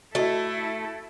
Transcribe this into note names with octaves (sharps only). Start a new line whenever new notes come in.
A3 E4 F#4 A4 D#5